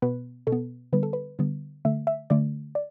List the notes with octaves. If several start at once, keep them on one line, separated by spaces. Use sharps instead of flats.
B2 B3 B4
B2 A4
B3
D3 G3 B3 B4
A4
B4
D3 G3 B3
D3 A3 E5
E5
D3 A3 D5
D5